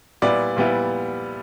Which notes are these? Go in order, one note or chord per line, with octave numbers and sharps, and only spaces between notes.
A#2 G3 B3 E4 D5
A#2 G3 B3 E4